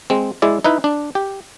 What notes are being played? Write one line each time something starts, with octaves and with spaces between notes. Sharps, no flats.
G#3 C4
G#3 E4 D5
D#4 E4 B4
D4
G4